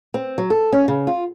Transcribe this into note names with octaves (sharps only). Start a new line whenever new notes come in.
C4
F#3
A4
C#4
C#3
F4